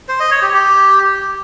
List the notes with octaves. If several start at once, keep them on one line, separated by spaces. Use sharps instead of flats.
C5
D#5
C#5
G4
G4